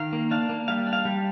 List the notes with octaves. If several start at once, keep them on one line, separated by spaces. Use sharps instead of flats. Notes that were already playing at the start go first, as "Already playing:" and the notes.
Already playing: D#3 F5
A#3
D4 F5
A#3
G3 F5
D4
F5
G3